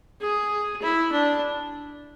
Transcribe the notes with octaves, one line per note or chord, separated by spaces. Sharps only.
G#4
E4
D4